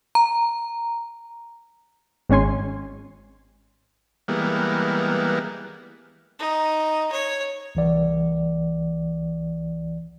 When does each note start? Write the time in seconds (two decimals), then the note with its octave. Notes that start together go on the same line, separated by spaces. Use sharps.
0.15 A#5
2.29 G#1 G#3 C#4 G#5 C6
4.28 E3 G3 G#3 A#3 B3
6.39 D#4
7.12 C#5
7.75 C2 E3 D5